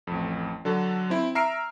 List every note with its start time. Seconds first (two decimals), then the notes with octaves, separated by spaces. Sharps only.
0.07 A1 F2
0.65 D3 F#3 A4
1.10 C4 E4
1.35 E5 A#5 E6 F6 C7 D7